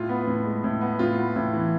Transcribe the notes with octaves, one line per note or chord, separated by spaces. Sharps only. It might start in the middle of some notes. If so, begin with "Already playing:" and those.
Already playing: A2 F4
B3
A2
G#3
A2
B3
A2 F4
B3
A2
E3